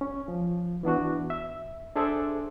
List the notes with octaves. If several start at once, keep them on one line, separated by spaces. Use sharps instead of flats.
C#4
F3
E3 B3 D4 F#4
E5
D4 G#4 A4 C5 D5 E5